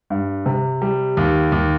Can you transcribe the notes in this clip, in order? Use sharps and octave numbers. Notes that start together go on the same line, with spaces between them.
G2
C3
G3
D#2
D#2